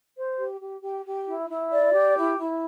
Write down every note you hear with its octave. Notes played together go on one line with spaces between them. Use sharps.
C5
G4
G4
G4
G4
E4
E4
D5
G4
E4
E4